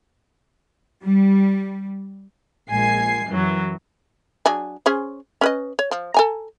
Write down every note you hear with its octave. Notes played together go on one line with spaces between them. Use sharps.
G3
A#1 G#3 G#5 C7
F#2 E3 F#3
F#3 D4 G#4
C#4 G#4 C5
C#4 B4 D#5
C#5
F3
A4 G#5 A#5